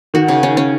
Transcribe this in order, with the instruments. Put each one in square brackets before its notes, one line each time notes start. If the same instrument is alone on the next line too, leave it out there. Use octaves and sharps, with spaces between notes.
[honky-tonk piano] D#3 [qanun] F#4
[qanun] C#3
C#4
C#4